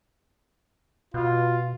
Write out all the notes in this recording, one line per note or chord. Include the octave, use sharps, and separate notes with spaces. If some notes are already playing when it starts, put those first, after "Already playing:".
B2 F4